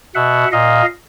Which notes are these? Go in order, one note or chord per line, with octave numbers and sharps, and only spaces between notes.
B2 E5 F#5
A#2 D#5 F5